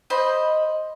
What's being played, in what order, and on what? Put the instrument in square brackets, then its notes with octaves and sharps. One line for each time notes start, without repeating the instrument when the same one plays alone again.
[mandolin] C5 D#5 B5